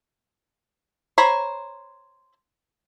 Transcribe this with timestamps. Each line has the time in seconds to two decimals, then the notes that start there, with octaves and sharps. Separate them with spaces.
1.18 C5 C#5 A#5 B5